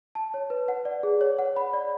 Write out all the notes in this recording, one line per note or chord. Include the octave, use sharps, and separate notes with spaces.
A5
C#5
B4
F#5
D5
G#4
C#5
F#5
B5
D5